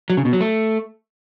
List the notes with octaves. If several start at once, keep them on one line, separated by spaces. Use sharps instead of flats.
F#3
C#3
B2
F#3
A3